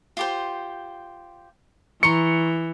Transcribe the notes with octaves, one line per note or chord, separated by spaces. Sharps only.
F4 G4 C5
E3 A#5 C6 C#6 C#7